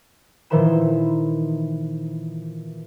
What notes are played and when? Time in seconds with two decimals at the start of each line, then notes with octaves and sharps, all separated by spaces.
0.50 A#2 D#3 E3 C5 B5 E7